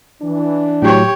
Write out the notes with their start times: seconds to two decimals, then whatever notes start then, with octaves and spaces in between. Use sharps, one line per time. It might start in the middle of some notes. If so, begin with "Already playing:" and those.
0.22 E3 D4
0.82 A2 F#3 G4 C#5